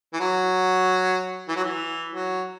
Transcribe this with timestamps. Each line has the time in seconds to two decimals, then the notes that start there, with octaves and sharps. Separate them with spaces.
0.13 E3
0.20 F#3
1.48 E3
1.56 F#3
1.64 E3
2.13 F#3